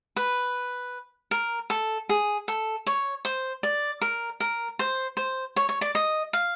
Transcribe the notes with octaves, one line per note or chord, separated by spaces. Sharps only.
B4
A#4
A4
G#4
A4
C#5
C5
D5
A#4
A#4
C5
C5
C#5
C#5
D5
D#5
F5